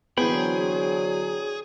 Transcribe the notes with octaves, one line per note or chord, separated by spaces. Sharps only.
D3 E3 F#3 B3 G#4 C5 G5 B5